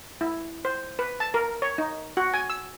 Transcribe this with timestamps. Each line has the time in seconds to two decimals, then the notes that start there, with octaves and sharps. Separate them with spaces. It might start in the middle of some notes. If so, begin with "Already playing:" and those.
0.21 E4
0.65 C5
0.99 B4
1.20 A5
1.34 A#4
1.62 C#5
1.78 D#4
2.17 F#4
2.34 G#5
2.50 E6